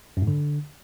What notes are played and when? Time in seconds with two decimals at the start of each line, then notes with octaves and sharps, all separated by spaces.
0.17 F#2
0.22 G#2
0.27 D3